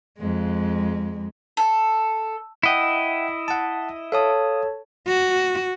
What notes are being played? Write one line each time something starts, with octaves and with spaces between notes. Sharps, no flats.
F2 G#3
A4
E4 D#5 E5 F#5 G5
F#5 A5
A4 C#5 F5 A5 D#6
F#4